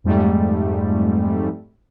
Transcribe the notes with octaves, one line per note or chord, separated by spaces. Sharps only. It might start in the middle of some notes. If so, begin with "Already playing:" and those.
F2 G#2 G3 A3